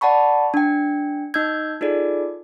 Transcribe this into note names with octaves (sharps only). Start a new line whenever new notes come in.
D5 F#5 A5 B5 C#6
D4 G5
D#4 D#5 E6 G6 G#6
D#4 F4 G#4 A4 D5